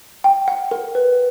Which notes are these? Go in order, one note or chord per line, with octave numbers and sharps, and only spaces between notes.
G5
F#5
A#4
B4